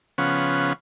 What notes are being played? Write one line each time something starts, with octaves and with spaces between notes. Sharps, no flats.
C#3 F3 B3 C#4 F#5